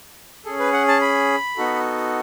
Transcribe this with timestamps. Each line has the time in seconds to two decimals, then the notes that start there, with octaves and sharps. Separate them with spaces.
0.45 C#4 G#4 A4
0.59 B4
0.73 F#5
0.88 A5
1.01 B5
1.57 B3 D#4 F#4 A4